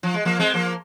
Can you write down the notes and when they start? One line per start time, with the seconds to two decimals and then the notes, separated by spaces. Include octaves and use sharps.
0.03 F3
0.14 G#3
0.25 F3 A#3
0.39 G#3 C4
0.54 F3 A#3